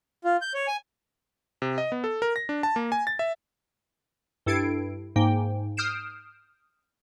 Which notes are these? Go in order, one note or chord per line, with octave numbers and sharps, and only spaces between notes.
F4
G6
C#5
G#5
C3
D#5
B3
A4
A#4
A#6
D4
A5
A#3
G#5
A6
E5
G2 E4 A4 G#6 C7 D7
G#2 A#3 G5
D#6 F6 G6 C7 D7 E7